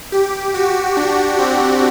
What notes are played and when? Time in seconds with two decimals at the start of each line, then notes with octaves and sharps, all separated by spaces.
0.12 G4
0.54 F#4
0.97 D4
1.38 C4